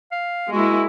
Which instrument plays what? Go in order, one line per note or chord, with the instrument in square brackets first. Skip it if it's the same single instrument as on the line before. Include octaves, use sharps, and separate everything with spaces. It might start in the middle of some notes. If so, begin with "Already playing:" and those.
[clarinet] F5
[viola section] G#3 A#3 E4 [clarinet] F#4